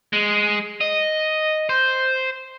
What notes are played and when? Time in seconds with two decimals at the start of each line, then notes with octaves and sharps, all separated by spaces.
0.13 G#3
0.81 D#5
1.69 C5